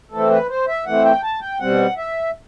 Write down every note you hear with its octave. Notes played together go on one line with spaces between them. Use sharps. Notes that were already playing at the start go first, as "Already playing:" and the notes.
E3 A3 C4 A4
B4
C5
E5
E3 A3 C4 F#5
G5
A5
G5
B2 G3 C4 F#5
E5